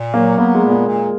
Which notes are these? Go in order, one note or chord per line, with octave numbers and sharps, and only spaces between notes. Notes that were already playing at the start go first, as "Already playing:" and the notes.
Already playing: A#2
F#3 A#3
A#3 B3
G#3
A#2
A#3
A#2